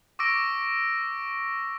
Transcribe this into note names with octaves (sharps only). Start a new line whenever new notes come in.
C#6 D6 E6 A#6 D7